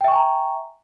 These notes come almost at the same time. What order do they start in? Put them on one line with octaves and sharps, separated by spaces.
G5 E5 C#6 G#5 A#5